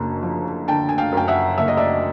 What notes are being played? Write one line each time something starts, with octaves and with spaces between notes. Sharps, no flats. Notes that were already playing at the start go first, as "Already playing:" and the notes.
Already playing: F#1 F#2 D3
F3
D3 G5 A5
G#5
F5 G5
F#2 G5
E5 F#5
F#1 E5
D#5
D5 E5